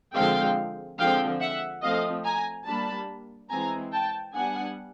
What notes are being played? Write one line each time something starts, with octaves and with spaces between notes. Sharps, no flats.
D3 F3 G#3 C4 F5 G5
D3 F3 G#3 C4 F5 G5
E5 F#5
F3 A3 C4 D#5 F5
G#5 A#5
G3 A#3 D4 A5 B5
E3 G#3 C4 G#5 A#5
G5 A5
G3 B3 D4 F#5 G#5